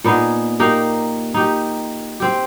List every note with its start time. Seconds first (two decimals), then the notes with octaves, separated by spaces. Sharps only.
0.04 A#2 B3 D#4 G#4
0.60 A#3 D#4 G4
1.34 D#4 G4
2.20 C4 G4